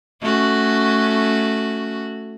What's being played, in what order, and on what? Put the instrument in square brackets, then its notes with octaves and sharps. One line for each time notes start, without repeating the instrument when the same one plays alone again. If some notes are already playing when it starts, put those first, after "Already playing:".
[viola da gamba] A3 C#4 F#4